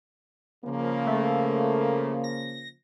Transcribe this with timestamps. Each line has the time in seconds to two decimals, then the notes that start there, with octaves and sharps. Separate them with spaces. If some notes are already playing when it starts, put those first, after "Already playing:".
0.65 C#3 F3 A#3
1.07 A3
2.24 A#6